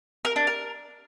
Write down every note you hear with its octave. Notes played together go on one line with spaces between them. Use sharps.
A#4
D4
A#4